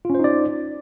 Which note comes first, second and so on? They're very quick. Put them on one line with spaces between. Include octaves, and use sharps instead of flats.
F4 C#4 C5 D#4 D5